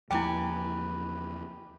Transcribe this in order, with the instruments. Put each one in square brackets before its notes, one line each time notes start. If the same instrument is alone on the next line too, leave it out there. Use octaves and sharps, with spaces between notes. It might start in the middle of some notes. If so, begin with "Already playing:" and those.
[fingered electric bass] E2 F3 A#3 [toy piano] E4 G5 [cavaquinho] G4 B4 G#5